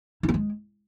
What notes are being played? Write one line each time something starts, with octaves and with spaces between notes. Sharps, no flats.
E4
B3
G#3